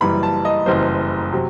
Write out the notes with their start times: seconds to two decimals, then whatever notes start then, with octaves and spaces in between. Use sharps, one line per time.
0.01 F#1 F#2 E3 G3 B5
0.23 A5
0.45 D#5
0.66 F#1 F#2 E3 G3 C5
1.32 C3 F#3